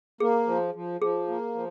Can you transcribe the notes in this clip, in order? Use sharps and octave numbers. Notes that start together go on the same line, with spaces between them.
A#3 G#4
F3
F3
F3 G#4
A#3
F3